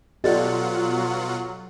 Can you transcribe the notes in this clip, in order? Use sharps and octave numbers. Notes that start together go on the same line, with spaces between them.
B2 F#3 F4 G4 A4 D5 D#5 F#5